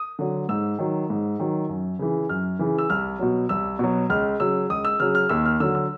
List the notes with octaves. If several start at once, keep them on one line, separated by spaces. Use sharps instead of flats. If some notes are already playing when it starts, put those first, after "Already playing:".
Already playing: D#6
D3 F#3
G#2 E6
D#3 F#3
G#2
D#3 F#3
F#2
C#3 E3
F#2 F6
C#3 E3
E6
C2 F6
B2 F#3
C2 E6
B2 F#3
C#2 F6
C#3 F#3 E6
C#2 D#6
E6
C#3 F#3 F6
F6
D#2 E6
F6
D3 F#3 E6
E6